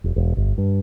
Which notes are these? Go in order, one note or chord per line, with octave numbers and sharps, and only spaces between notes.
E1
E1
G1
G2